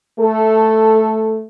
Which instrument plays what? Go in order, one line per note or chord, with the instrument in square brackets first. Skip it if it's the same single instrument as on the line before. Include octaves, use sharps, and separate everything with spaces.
[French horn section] A3 A4